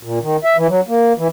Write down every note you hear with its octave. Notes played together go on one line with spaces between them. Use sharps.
A#2
D#3
E5
E3
F#3
A#3
E3